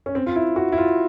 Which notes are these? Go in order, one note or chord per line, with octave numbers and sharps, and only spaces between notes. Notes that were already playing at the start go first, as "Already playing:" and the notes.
C#4
C4
F4
E4
F#4
E4
F4